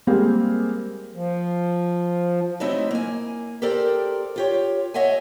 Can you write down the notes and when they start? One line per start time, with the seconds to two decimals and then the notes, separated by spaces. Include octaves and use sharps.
0.07 G3 G#3 A#3 C4 G4 G#4
1.14 F3
2.60 F#3 A3 C4 D#4 E4 D#5
2.91 A#3 G#5
3.62 G4 A4 A#4 C5 D5 G5
4.36 F4 G4 C#5
4.94 C#5 D#5 E5 F#5 G#5